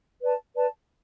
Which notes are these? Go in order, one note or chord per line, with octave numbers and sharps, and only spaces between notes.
B4 D5 A5
B4 D5 A5